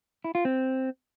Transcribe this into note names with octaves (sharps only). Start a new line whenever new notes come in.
E4
F4
C4